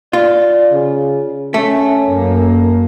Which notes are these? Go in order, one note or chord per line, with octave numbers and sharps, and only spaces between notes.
F4 D5
C#3
A3 C#4
F#2 A#3